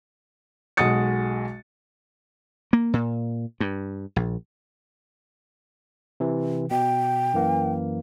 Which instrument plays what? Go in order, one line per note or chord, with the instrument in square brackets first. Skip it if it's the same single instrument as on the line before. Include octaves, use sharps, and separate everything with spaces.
[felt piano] B1 G#3 F#4 D#6 A6 C#7
[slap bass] A#3
A#2
G2
A#1
[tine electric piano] C3 E3
[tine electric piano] B2 [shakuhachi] G5
[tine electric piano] F#2 E3 A#3